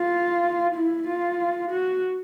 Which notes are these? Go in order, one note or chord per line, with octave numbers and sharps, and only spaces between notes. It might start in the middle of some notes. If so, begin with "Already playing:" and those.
Already playing: F4
E4
F4
F#4